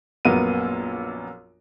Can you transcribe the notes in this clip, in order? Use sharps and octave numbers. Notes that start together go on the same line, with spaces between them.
A#1 F#2 A#3 B3 D#7